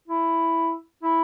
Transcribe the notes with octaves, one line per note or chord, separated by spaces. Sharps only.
E4
E4